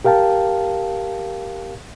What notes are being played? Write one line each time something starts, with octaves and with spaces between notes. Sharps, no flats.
G4 A#4 F5 G5 A5